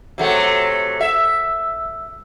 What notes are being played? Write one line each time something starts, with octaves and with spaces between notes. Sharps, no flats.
C3 F#3 A3
E5